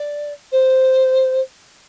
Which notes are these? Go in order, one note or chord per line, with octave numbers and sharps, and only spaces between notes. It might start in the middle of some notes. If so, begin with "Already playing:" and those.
Already playing: D5
C5